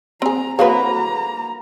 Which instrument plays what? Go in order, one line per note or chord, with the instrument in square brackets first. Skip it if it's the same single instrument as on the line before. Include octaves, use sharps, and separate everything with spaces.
[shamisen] C4 G#4 [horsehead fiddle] A#5
[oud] A#3 F#4 B4 [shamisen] C4 C#5 [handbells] G#4 F5 [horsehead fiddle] A#5